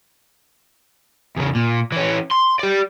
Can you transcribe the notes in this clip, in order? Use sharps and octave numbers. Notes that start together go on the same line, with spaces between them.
E2 C#3
A#2
E3 C#4
C6
G4 D5